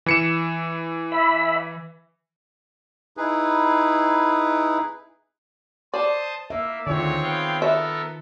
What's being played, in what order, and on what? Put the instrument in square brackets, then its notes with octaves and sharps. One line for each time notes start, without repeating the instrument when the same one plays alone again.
[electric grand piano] E3 C#7 E7
[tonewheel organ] E5 B5
[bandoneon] D#4 E4 G#4 B4
[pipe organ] C5 A5 D#6 [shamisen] D5
[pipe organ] A#3 [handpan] E5
[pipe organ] D2 [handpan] D#3 F4 [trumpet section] C4 G#4 C#5
[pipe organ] B3 F5 G5
[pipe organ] B3 A4 A#4 [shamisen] E5